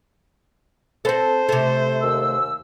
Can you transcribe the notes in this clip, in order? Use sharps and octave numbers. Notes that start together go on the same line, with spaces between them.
C4 A4 C5
C3 A3
D#2 E6